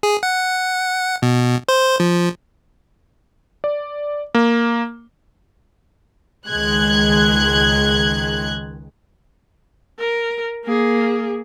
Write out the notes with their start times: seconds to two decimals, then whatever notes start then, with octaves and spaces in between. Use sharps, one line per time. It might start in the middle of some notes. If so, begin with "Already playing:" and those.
0.03 G#4
0.23 F#5
1.22 B2
1.68 C5
2.00 F3
3.64 D5
4.35 A#3
6.46 C#2 D#3 G#3 F#6 G#6
9.99 A#4
10.64 A#3 G#4